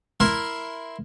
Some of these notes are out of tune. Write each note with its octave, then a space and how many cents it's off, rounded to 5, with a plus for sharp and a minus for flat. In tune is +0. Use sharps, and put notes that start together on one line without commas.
E4 +0 A#4 +0 C6 +0